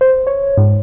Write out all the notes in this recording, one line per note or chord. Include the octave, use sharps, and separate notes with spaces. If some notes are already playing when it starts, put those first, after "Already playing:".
C5
C#5
G#2